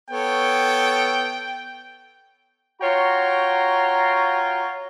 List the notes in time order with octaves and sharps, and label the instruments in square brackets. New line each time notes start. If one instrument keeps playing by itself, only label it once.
[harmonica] B3 A4 C#5 [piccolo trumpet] G5
[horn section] F4 F#4 C#5 G5 A#5